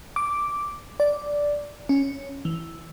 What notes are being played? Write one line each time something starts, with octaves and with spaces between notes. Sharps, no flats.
D6
D5
C#4
E3